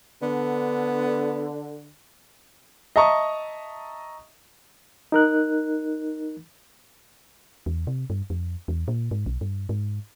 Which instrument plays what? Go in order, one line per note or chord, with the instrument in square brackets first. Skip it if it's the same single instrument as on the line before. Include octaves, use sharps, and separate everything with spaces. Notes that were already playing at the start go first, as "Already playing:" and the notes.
[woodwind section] D3 [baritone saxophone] B3
[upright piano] D#5 E5 A5 A#5 C#6 D#6
[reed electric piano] D#4 A#4 F#6
[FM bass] E2
C3
G2
F2
E2
A#2
G#2
B1
G2
G#2